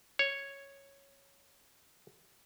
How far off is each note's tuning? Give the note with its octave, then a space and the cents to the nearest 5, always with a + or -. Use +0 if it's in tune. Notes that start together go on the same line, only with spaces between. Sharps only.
C#5 -5